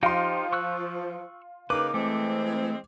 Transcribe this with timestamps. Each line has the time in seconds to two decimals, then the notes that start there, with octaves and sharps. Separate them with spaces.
0.03 F3 D#4 F4 G4 G5 C6
0.53 C#6 E6 F#6
1.70 C#3 A#3 D#4 B4 D6
1.94 E3 G#3 A3 C4